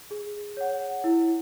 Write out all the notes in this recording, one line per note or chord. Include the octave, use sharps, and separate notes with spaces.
G#4
C#5 F#5
E4